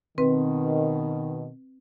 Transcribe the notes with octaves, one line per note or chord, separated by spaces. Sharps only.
B2 D#3 C4 B4